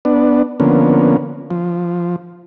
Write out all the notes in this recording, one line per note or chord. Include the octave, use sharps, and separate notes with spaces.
B3 D4
D3 F3 A#3 B3 C#4
F3